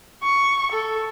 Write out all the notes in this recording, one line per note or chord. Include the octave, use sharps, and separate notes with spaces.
C#6
A4